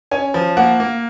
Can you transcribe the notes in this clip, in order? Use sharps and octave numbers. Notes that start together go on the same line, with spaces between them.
C#4 G#5
F3
A#3 F#5
A#3